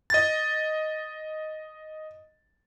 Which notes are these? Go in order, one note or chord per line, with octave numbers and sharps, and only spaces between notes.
D#5 A6